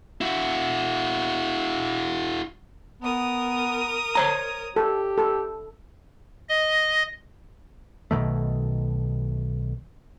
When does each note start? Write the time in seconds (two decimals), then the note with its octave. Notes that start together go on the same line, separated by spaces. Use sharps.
0.21 E4 F#4
3.03 B3 A#4 D#6
4.15 C5 C#5 A#5
4.76 G4 A4
5.18 A4
6.49 D#5
8.11 B1 B2 D#3 A3